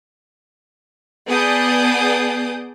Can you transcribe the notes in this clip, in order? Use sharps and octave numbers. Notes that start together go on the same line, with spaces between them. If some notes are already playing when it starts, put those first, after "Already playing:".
B3 G#4 D5 A5 D#6 G6